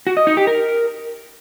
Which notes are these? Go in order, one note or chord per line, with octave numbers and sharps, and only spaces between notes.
F#4
D#5
D#4
G4
A#4